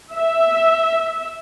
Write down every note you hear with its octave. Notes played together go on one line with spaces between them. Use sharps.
E5